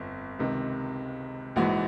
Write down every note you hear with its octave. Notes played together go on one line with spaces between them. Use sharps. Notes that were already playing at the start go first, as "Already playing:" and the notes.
Already playing: G1 F2
C#2 C3 D#3
A#1 G#2 E3 F#4